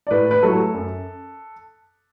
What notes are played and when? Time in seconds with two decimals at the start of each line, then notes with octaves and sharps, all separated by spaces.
0.07 D5
0.11 A2 B4
0.31 B4
0.42 F#3 A3 E4 A4
0.74 F#2